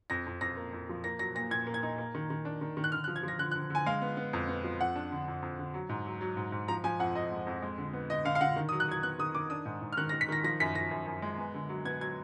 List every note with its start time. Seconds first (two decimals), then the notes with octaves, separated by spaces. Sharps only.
0.10 F2 A#6
0.27 F2
0.41 F2 A#6
0.57 A#3
0.73 F2
0.89 F3
1.04 A#3 A#6
1.19 F#3 A#6
1.35 A#2 A#6
1.51 A#2 G#6
1.67 A#3
1.74 G#6
1.83 D#4
1.98 A#3
2.15 D#3
2.30 D#3
2.45 D4
2.61 D#3
2.77 D#3
2.84 F#6
2.92 D3 F6
3.04 F#6
3.08 F3
3.16 G#6
3.23 F3 A#6
3.39 D3 F#6
3.51 F#6
3.55 D3
3.70 D3 G#5
3.86 G#3 F5
4.02 B3
4.17 B3
4.33 F2
4.48 B3
4.64 F3
4.81 F2 F#5
4.96 D4
5.11 D3
5.28 F2
5.42 F2
5.59 D3
5.74 F#3
5.89 G#2
6.06 F#3
6.21 F#3
6.37 G#2
6.52 G#2
6.68 F3 A#5
6.84 F3 G#5
6.99 F2 F#5
7.15 F2 D#5
7.32 G#3
7.47 F2
7.62 G#3
7.78 D3
7.93 B3
8.10 D3 D#5
8.25 D3 F5
8.35 F5
8.41 D3 F#5
8.56 D#3
8.69 D#6
8.72 F#3
8.80 F#6
8.88 F#3 G#6
9.03 B3 F#6
9.19 D#3 D#6
9.35 D#3 D6
9.50 D4 D#6
9.66 G#2
9.82 G#2
9.92 F6
9.97 D#3 F#6
10.09 A#6
10.12 D#3
10.21 B6
10.29 D#3 A#6
10.44 F3 A#6
10.60 F#2 B6
10.75 F#2 A#6
10.91 F#2
11.07 F#2
11.22 G#3
11.38 B3
11.54 D3
11.69 F#3
11.85 B3 G#6
12.01 F#3 G#6